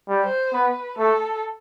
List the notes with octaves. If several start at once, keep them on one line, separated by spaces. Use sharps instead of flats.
G3
C5
B3 B4
A3 A4